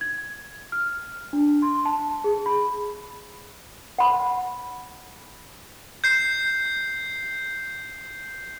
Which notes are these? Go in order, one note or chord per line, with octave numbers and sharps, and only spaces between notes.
G#6
F6
D4
C6
A5
G#4
B5
F#5 B5
G6 C7